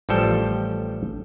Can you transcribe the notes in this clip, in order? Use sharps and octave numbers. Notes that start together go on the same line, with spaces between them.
A1 F3 G3 A4 G5